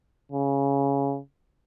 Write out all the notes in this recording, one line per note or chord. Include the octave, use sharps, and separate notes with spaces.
C#3